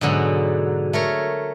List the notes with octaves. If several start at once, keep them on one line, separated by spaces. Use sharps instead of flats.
G#2 B2 D3 F#3
A3 A#4 C#5